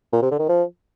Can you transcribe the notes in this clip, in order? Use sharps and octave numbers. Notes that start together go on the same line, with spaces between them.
A#2
C3
D3
D#3
F3